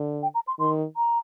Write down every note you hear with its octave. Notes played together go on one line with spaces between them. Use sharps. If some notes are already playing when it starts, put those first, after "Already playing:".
Already playing: D3
G5
A#5
C6
D#3 C6
A#5